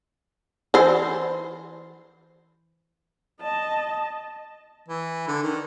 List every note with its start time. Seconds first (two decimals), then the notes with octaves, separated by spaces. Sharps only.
0.74 E3 C5
3.42 D#5 A5
4.88 E3
5.28 D3
5.43 D#3